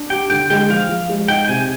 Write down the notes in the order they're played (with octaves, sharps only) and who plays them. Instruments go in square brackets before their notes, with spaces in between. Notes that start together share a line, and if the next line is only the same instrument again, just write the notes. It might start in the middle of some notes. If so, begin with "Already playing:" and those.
Already playing: [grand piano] D4
[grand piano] G4 [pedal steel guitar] G5
[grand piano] D3 [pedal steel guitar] G5
[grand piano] G#3 [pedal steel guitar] G5
[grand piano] F3 [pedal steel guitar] F5
[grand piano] F3
G#3
[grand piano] D#4 [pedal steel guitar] G5
[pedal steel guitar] G5
[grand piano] C3 [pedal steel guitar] G#5